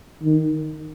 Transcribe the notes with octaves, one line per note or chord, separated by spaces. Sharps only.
D#3